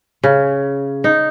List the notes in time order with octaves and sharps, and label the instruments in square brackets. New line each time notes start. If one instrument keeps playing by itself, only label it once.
[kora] C#3
D#4